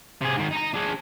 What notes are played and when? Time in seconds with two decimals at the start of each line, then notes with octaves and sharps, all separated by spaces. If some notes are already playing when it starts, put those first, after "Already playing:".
0.22 C3 G#4
0.38 G#2 D#3
0.53 D#4 A#5
0.74 D4 G#4